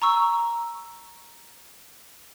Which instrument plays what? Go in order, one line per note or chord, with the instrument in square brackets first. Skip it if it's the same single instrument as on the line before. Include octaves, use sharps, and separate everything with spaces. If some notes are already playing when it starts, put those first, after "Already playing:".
[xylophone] A#5 C#6 E6